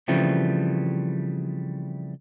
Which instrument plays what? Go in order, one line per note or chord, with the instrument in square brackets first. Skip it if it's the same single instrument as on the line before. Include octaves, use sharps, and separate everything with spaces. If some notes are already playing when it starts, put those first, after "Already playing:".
[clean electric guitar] C#3 E3 F3 G3 A3 C4